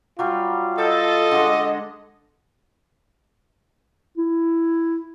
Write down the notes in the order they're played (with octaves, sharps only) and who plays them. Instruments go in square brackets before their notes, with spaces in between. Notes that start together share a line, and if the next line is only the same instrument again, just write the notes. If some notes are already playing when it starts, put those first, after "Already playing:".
[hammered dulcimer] F#3 G3 [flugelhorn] F4
[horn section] A4 [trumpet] D#5 [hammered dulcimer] G5
[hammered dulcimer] D3 G#3
[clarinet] E4